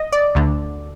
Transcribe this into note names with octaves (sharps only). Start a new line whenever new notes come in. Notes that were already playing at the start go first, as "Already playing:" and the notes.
Already playing: D#5
D5
D2 D3